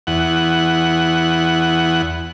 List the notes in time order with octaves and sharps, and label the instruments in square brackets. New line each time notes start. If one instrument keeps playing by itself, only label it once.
[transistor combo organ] E2 F#5